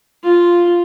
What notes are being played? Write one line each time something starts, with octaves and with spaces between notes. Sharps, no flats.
F4